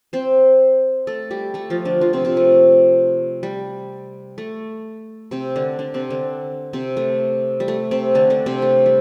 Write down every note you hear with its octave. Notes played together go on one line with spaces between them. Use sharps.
C4 C5
A3 A4
G3 G4
A3 A4
F3 F4
D3 D4
F3 F4
C3 C4
C3 C4
A3
G3
A3
C3 C4
D3 D4
D3 D4
C3 C4
D3 D4
C3 C4
A3
G3
A3
C3 C4
D3 D4
D3 D4
C3 C4
A3
G3